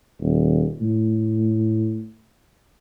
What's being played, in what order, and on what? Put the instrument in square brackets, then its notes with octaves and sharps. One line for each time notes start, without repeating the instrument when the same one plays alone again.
[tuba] D#1
A2